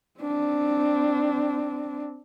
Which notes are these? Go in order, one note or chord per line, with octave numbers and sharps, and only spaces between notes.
C4 D4